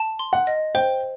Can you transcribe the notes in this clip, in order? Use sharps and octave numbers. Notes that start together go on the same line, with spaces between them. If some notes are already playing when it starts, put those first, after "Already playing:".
Already playing: A5
C6
F#5
D#5
C5 G5